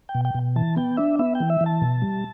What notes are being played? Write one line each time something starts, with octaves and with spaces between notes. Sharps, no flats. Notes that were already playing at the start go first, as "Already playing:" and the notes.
G5
B2
G5
B2
E3 A5
B3 G5
D4 E5
B3 E5
G5
E3
E5
E3
A5
B2
G3